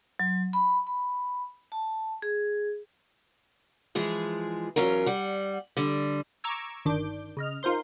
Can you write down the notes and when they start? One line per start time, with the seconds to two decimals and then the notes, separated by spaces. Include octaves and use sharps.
0.19 F#3
0.53 B5
0.87 B5
1.72 A5
2.22 G#4
3.95 E3 F3 G#3 G#4
4.76 E2 F#3 C#4 F4 A#4
5.06 G3 F#5
5.77 D3 G3
6.44 A#5 C#6 D6 E6 G#6
6.85 G1 D#3 D4 D6 G6
7.37 C#3 D#5 F6
7.63 D#4 F4 A#4 C5 C6